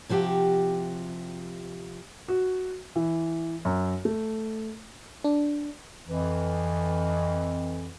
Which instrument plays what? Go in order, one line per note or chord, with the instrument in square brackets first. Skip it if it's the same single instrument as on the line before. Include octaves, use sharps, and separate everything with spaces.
[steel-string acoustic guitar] C3 F3 F#4 G4
[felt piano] F#4
E3
F#2
A3
[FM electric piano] D4
[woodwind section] F2 E3